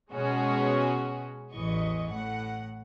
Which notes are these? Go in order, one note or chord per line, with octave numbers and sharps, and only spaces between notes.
B2 G#3 C#4 F#4 G#4
A1 E2 E3 D#5 C#6
A2 F#5